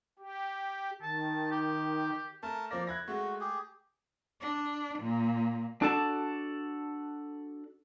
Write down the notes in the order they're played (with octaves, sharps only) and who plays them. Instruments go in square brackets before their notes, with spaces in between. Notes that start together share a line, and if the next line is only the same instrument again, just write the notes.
[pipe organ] G4
[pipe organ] D#3 [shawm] A5
[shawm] G4
[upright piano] A3 [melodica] A#4 A5
[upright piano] F3 A#6 [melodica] A#3 D5
[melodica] E4 [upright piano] F#6 G#6 A#6
[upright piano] G#3 A3 [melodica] F#4
[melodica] G4 G#4
[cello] D4
A#2
[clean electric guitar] D4 F#4 A4 D5 A5